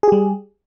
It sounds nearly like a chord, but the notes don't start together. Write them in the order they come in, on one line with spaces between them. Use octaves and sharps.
G#4 G4 G3